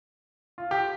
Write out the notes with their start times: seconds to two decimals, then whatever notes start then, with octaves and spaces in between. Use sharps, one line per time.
0.58 F4
0.71 G4